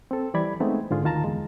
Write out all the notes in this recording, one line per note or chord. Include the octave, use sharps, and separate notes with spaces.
C4 A4
E3 G3 D5 B5 G#6
G#3 A3 B3 C4 D#4
G#2 D3 F4 G#4
D2 D#3 F4 A5 A#5
E2 G#3